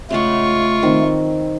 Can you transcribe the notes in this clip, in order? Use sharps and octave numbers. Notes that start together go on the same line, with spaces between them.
C#3 G#3 A3 F4 F#5 C#6
D#3 C4